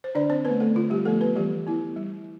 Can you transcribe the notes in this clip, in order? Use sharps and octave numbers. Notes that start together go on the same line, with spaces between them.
C5
D3 D4 D5
C4 C5
A3 B3 C4 B4
A3 A4
D3 F4
G3 G4
F3 A3 B3 A4
B3 B4
E3 G3 G4
B3 E4
G3